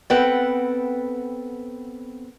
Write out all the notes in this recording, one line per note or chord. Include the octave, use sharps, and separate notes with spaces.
B3 C4 A4 B4 F#5 G5